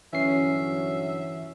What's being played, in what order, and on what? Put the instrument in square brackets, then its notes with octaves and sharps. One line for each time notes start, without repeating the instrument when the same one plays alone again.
[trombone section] G2 D3 F#3 [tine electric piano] E3 C7 [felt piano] C#4 [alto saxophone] E5